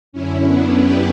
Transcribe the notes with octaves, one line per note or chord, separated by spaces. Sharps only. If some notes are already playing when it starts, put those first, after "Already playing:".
F#2 D3 C#4 E4
B3 D4
G4 B4